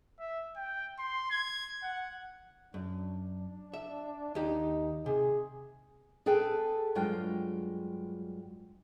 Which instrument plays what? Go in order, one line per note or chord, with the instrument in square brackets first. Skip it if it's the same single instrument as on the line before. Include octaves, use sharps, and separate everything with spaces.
[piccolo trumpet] E5
G5
C6
G#6
F#5
[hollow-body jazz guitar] F#2 [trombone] D4
[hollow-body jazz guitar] E5
[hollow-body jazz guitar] D#2 G4 [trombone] D#4
[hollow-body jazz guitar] C3 [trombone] G#4
[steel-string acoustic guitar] G#4 A4 B4 G5
G2 F#3 G#3 F4 G5